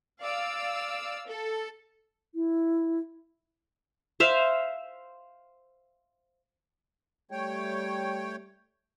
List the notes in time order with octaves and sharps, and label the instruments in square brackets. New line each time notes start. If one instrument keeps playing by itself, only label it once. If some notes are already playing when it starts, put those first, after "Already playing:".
[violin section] D5 F5 E6
A4
[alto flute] E4
[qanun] C5 E5 F5
[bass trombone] G3 [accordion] A3 C#5 G5